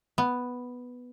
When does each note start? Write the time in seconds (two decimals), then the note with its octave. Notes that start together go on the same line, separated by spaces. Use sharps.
0.18 B3